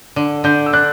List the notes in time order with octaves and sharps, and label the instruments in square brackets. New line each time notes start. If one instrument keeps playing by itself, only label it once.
[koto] D3
[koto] D3 [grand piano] G6
[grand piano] E6
[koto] D4 [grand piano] F#6